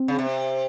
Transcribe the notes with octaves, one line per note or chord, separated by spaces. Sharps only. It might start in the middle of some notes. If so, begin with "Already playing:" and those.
Already playing: C4
C#3
C3